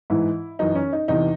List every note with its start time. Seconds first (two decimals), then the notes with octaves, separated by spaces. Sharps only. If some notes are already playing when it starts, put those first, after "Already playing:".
0.10 G#2 E3 E4
0.59 F#2 E3 D#4
0.75 C#4
0.93 D#4
1.08 E2 C3 E3 D#4